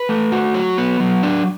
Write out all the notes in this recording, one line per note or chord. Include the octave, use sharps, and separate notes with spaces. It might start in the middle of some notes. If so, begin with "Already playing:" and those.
Already playing: B4
A3
F#4
F#3
B3
F#3
D4